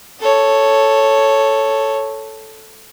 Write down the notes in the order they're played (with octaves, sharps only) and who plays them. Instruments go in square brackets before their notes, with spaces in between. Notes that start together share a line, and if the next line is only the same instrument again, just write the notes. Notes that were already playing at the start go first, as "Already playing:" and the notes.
[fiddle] A4 C#5